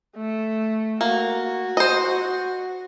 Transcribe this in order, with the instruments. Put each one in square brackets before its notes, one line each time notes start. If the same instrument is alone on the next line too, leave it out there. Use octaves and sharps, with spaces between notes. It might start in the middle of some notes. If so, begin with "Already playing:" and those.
[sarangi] A3
[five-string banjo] A#3 [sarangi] F#4
[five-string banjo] C5 D#5